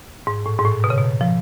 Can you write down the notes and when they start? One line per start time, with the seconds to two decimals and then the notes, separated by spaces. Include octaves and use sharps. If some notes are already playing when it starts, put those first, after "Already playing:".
0.27 G#2
0.46 A2
0.59 G#2
0.65 A2
0.84 B2
0.90 C#3
0.98 B2
1.21 F3